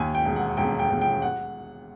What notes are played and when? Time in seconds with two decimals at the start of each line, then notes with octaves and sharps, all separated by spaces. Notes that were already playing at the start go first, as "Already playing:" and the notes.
Already playing: D#2 G#5
0.15 G5
0.25 E1
0.36 F#5
0.57 E1 G5
0.79 G5
0.90 E1
1.01 G5
1.22 F#5